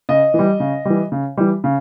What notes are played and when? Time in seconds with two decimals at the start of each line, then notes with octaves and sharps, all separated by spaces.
0.09 C#3 D#5
0.34 E3
0.39 G3
0.60 C#3
0.85 E3 G3
1.12 C#3
1.37 E3 G3
1.64 C#3